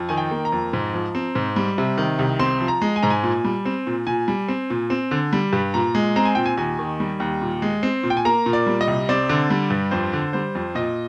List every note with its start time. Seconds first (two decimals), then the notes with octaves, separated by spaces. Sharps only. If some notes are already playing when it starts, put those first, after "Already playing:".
Already playing: F2
0.09 D#3 G#5
0.18 G5
0.31 A#3
0.45 A#5
0.52 F2
0.73 G#2
0.94 F3
1.15 C4
1.35 G#2
1.56 G3
1.78 C3
1.98 D#3
2.19 C2
2.39 C4 C6
2.60 F3
2.68 A#5
2.82 G#3
2.96 G#5
3.03 G#2 A#5
3.10 G#5
3.23 A#2
3.45 G3
3.65 C4
3.87 A#2
4.07 A#2 G#5
4.28 G3
4.48 C4
4.70 A#2
4.90 C4
5.11 D3
5.33 G3
5.53 G2
5.74 A#2 A#5
5.95 G#3
6.16 C4 A#5
6.25 G#5
6.35 A#2 G5
6.46 G#5
6.57 D#2 G#5
6.79 D#3
7.00 G3
7.20 D#2
7.42 A#2
7.62 G#3
7.83 C4
8.03 A#2
8.10 G5
8.17 G#5
8.25 A#3 A#5
8.46 A#2
8.53 D5
8.67 G3
8.81 D#5
8.88 C2
9.09 C4 D5
9.29 D3
9.50 G3
9.70 G2
9.91 F2 C5
10.13 D3
10.33 G3 C5
10.55 F2
10.75 A#2 D#5